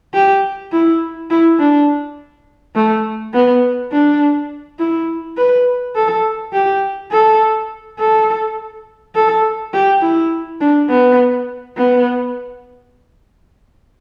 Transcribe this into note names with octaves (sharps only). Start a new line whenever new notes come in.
G4
E4
E4
D4
A3
B3
D4
E4
B4
A4
G4
A4
A4
A4
G4
E4
D4
B3
B3